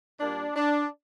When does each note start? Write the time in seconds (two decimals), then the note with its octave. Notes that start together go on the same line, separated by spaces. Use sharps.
0.20 A#2 G3 A#3 D4
0.55 D4